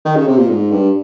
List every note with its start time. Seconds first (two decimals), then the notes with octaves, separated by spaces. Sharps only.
0.05 D#3
0.16 C#3
0.28 C3
0.38 A#2
0.50 G#2
0.72 G2